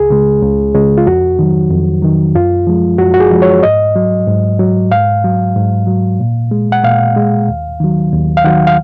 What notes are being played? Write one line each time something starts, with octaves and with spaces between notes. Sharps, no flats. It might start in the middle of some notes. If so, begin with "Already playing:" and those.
Already playing: C#2 G#4
C#3 G#3
C#2
C#3 G#3
F4
F2 F#4
D#3 F#3
F2
D#3 F#3
F#2 F4
F3 G#3
F#2 F#4
F#4
G#4
F3 G#3
C#5
G#2 D#5
F#3
G#2
F#3
G#2 F5
F#3
G#2
F#3
A#2
G#3
F#5
A#2 F5
G#3
D#2
D#3 F#3
D#2
F5
D#3 F#3 F#5
F5